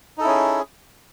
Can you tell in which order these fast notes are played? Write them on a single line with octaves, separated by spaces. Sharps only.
D#4 A4 E4 C#4 G#4